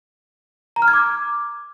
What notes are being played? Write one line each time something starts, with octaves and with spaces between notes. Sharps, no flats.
A#5
F6
G#6
D6